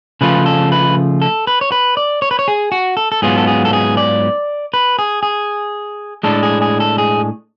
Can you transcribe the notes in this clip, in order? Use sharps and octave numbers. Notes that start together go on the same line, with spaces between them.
C#3 F3 A3 F4 B4
A4
B4
A4
B4
C#5
B4
D5
C#5
B4
C#5
G#4
F#4
A4
A4
G#2 F#3 B3 F4 G#4
A4
G#4
A4
G#4
D5
B4
G#4
G#4
A2 G#3 D4 A4
G#4
G#4
A4
G#4